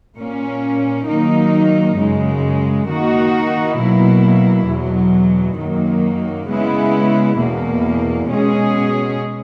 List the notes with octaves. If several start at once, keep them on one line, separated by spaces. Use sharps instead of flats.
A#2 A#3 C#4
D#3 F#3 A#3 D#4
F#2 C#3 G#3
D#3 A#3 D#4 F#4
B2 F#3 A#3 E4
E2 B2 F#3
F#2 D#3 F#3 A#3
C#3 G#3 B3 E4
E2 B2 A#3
B2 G#3 C#4 G#4